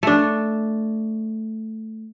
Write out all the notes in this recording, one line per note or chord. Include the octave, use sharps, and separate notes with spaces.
A3 D4